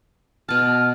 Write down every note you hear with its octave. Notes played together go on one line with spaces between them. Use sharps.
B2 A5 F6